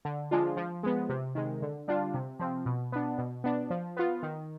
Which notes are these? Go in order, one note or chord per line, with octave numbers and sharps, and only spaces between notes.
D3
F3 G#3 D4 F4
F3
G#3 B3
C3
D#3 G#3
D3
G3 D4 F4
C3
F3 C4
B2
B3 D4
B2
B3 D4
F3
B3 F4
D#3